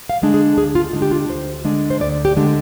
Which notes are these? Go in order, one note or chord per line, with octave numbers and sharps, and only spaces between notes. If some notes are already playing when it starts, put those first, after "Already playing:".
F5
D3 G#3 D4
G#4
D2 G#4
F4
D3 G#3 D4 D#4
G4
F4
D2 C5
D3 G#3 D4
C5
D2 D5
G4
D3 G#3 D4